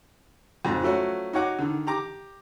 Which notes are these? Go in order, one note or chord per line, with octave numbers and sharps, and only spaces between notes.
F2 G#2 F#3
F3 F#3 A3 C#4 F#4
D#4 F#4 C#5 F#5 D6
D3 D#3
G4 A#5 D6